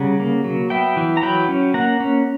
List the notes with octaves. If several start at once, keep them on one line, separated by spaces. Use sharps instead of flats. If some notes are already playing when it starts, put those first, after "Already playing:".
Already playing: C#3 G3 F#5 A#5
A#3
F#3
B3 E5 G5
E3
A#5
F#3 G5 B5
C#4
A#3 F#5 A#5
C#4